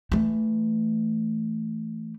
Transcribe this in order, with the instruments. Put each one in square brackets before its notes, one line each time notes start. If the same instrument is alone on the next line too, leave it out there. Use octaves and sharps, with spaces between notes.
[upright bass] E3 A3